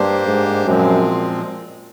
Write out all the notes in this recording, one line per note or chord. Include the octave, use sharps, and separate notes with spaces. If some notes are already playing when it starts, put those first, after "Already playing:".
Already playing: G2 A#3 D4 G4 C5
G#2
F#2 A#2 F3 G#3 C4